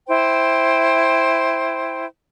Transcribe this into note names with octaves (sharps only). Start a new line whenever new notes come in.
E4 C5 G5